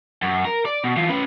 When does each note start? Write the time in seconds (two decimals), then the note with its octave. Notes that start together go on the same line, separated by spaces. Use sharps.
0.22 F#2
0.45 A#4
0.65 D5
0.84 B2
0.96 E3 F4
1.09 C#4 B4